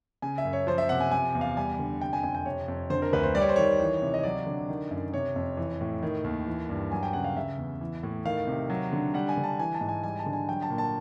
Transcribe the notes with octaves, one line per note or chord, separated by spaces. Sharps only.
C#3 G#5
E5
F#2
C#5
F3 C5
E5
C3 F#5
G#5
C3 G#5
E2
F5
G3 G#5
D3
C3 G5
G#5
F2 G#5
G5
C3 C#5
F2
D3 C5
A#4
D2 B4
C5
G3 D5
C#5
C5
D#3 C#5
E3
C3
D#5
F#3 D5
D3
D#3
F#2
C3 C#5
F2
E3
A2
D#3
D#2
E3
G2
F#3 G#5
G5
C#3 F#5
F5
C#3 E5
E2
E3
A2
D#3 F5
C3
F#3
D3
G3 F#5
G#5
D3
A5
E3 G#5
A5
G#2
G#5
G3 G#5
A5
D3
G#5
F#3 G5
A5
A#2
A5